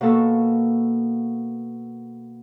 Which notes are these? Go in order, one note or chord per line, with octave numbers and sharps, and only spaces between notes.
B2 A#3 A4 C#6